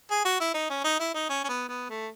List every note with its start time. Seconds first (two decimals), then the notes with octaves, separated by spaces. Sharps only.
0.11 G#4
0.25 F#4
0.41 E4
0.54 D#4
0.70 C#4
0.84 D#4
1.00 E4
1.14 D#4
1.30 C#4
1.44 C#4
1.49 B3
1.69 B3
1.90 A3